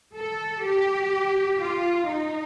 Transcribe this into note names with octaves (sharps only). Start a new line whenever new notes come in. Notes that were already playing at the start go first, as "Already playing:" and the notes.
A4
G4
F4
D#4